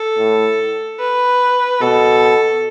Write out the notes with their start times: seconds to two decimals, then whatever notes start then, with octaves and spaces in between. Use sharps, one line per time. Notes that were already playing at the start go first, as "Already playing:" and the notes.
Already playing: A4
0.18 A2
0.99 B4
1.81 B2 A4